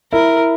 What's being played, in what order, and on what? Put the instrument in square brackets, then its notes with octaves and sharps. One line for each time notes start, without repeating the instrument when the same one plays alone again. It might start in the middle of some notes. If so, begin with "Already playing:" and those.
[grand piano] E4 [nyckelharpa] A#4